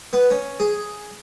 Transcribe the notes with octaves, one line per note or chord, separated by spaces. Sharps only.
B3
C#4
G#4